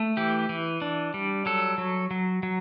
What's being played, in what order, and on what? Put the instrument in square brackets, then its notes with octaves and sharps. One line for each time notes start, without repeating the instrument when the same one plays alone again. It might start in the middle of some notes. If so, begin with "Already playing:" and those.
Already playing: [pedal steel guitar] A3
E3 G4
E3
D4
G3
F#3 A4
F#3
F#3
F#3